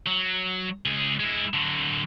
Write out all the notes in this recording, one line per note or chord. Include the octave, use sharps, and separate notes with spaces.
F#3
C#2 G#4
G#3 E4
D3 F#3